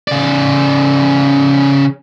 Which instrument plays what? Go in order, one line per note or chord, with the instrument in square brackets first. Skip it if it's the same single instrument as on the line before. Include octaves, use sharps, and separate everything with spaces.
[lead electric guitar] C#3 D5